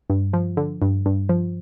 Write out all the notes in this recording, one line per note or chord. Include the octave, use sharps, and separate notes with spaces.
G2
F3
D3
G2
G2
F3